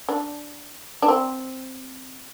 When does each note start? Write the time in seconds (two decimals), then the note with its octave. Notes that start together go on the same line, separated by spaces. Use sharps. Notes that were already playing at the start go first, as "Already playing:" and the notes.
0.09 D4
1.02 D4
1.08 C4